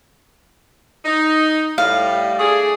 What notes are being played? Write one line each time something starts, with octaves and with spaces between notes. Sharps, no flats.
D#4
A2 G3 F5
A3 D4 G#4